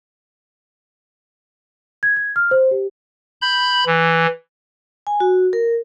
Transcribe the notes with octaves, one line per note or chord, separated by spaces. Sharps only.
G#6
G#6
F6
C5
G4
B5 G6
E3
G#5
F#4
A#4